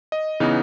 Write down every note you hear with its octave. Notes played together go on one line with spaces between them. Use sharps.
D#5
C#3 E3 B3 D#4